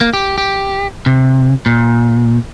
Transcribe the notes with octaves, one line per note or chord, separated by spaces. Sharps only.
A#3
G4
G4
C3
A#2